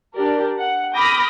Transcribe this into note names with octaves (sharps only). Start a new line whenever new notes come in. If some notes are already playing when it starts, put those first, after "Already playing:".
D4 G4 A#4 D5
F#5
B5 D6 D#6 F6 G6 A#6